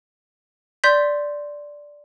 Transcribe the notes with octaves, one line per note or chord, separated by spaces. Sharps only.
D5 C6 G6 B6